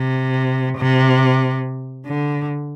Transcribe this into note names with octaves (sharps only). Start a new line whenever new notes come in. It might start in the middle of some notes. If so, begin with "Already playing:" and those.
Already playing: C3
C3
D3